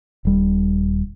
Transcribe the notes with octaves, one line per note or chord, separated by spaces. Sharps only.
D#1 G3